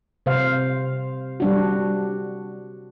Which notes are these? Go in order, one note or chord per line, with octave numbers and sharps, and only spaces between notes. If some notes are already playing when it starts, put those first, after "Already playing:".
C3 C5 F5
G3 D4 F#4